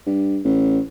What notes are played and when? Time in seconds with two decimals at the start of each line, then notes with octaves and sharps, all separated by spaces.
0.06 G2
0.45 A1